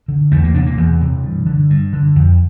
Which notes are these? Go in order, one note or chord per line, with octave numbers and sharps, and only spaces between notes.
D3
E2 A3
A#3
C3 D4
A#3
E2 E3
C3
G2
D3
G2
D3
F2